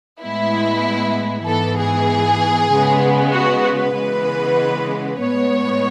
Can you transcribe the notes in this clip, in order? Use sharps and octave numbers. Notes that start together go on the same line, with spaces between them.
A2 G#3 B3 E4
G#2 E3 B3 A4
G#4
C#3 G#3 B3
F#4
B4
C#3 E3 G#3 B3
A2 G#3 B3 C#5